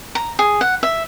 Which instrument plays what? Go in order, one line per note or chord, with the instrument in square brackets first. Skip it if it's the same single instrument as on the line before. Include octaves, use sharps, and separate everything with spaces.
[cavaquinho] A#5
G#4
F#5
E5